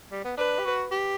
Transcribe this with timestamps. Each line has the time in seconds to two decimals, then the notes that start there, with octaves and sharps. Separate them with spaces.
0.12 G3
0.24 B3
0.37 D4 B4
0.59 G4
0.65 F#4
0.91 G4